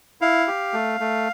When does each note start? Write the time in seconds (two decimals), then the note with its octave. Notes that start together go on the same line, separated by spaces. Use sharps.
0.21 E4 F5
0.47 G4
0.73 A3
1.00 A3